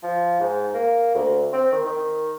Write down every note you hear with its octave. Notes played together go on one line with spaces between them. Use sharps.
F3
G#2
A#3
D2
C4
D#3
D#3